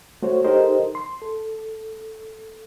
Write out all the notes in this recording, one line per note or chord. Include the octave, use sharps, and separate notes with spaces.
A3 F#4 C5 C#5
D#4 G4 A4 A#4 C5 D#5
C6
A4